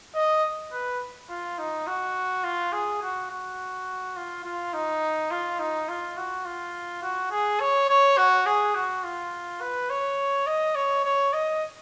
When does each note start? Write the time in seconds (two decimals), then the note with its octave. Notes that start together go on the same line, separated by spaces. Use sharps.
0.15 D#5
0.72 B4
1.29 F4
1.58 D#4
1.87 F#4
2.44 F4
2.72 G#4
3.02 F#4
3.30 F#4
4.16 F4
4.44 F4
4.73 D#4
5.31 F4
5.59 D#4
5.89 F4
6.17 F#4
6.45 F4
7.02 F#4
7.31 G#4
7.60 C#5
7.89 C#5
8.17 F#4
8.46 G#4
8.75 F#4
9.04 F4
9.61 B4
9.90 C#5
10.47 D#5
10.75 C#5
11.04 C#5
11.33 D#5